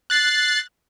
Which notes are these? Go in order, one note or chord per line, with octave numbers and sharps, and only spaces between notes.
F#6 A6 C7